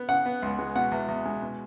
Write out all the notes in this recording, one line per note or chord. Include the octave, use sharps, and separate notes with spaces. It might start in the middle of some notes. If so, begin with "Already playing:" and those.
Already playing: B3
C#3 F#5
B3
C#2
G#3
B2 F#5
E2
E2
G#3
B2